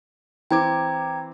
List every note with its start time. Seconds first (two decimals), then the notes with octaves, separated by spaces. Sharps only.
0.51 E3 C4 G5 A#5 D6 G#6